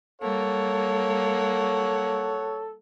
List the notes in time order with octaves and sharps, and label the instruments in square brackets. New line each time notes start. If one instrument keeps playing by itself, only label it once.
[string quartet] G3 A#3 [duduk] A4 [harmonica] C#5 F#5